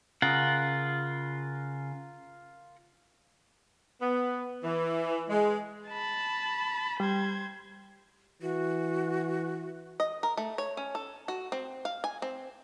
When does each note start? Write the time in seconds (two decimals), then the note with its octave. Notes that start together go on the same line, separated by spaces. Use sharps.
0.22 C#3 F4 A#4 F#5
4.01 B3
4.64 E3
5.29 G#3
5.89 A5 B5
7.00 G3 C5 G#6
8.42 E3 F#4
10.00 D#5
10.23 A#4
10.37 A3
10.58 C#5
10.77 C#4
10.95 A4
11.28 F#4
11.52 C4
11.85 F5
12.04 G#5
12.22 C4